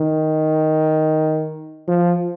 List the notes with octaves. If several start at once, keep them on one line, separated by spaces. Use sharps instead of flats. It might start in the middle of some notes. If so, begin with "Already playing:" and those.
Already playing: D#3
F3